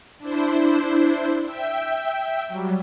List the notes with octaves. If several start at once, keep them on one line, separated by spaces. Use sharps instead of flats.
D4 E4 C5
E5 G5
F#3 G3